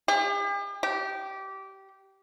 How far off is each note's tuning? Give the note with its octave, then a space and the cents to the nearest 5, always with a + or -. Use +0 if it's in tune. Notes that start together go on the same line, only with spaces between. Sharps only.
G4 +45
G4 -20